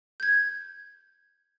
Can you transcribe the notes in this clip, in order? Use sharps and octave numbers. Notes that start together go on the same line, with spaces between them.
G6 G#6